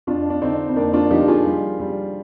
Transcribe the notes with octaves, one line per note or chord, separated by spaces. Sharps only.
F2 D4 F4
D4
D3 C4 D#4
C4
F2 A#3 D4
D4 F4
F3 D#4 G4
F4 G#4
G3
G3